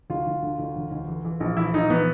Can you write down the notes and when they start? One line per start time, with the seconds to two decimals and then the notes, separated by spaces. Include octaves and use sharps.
0.10 D2 F4
0.27 D2
0.43 D3
0.59 D2
0.75 E1
0.92 D2
1.08 E3
1.25 E3
1.40 A#1
1.57 E3 E4
1.74 A#1 D#4
1.90 E3 B3